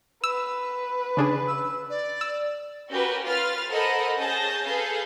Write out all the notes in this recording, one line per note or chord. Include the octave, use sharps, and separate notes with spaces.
B4 E6
C#3 D4 G#4
E6
D5
E6
C#4 F#4 G4 A#4 B4
F4 B4 F6 A6
A4 A#4 C5 D#5 F#5 B5
C#4 G#4 A5 G6 A#6
G#4 A4 B4 F5 G6